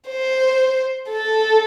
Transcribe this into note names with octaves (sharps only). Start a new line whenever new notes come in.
C5
A4